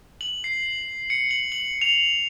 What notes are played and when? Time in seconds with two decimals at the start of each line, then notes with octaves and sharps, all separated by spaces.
0.21 F#7
0.44 C7
1.10 C#7
1.31 F#7
1.52 F#7
1.81 F7